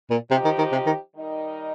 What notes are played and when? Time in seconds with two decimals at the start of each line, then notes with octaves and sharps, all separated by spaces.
0.10 A#2
0.31 C3 F3 D#4 G4
0.44 D#3
0.58 D#3
0.72 C3
0.86 D#3
1.14 D#3 G3 D#4 A#4 D#5